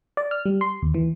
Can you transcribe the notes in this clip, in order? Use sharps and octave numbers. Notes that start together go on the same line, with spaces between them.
D5
F6
G3
C6
D#2
E3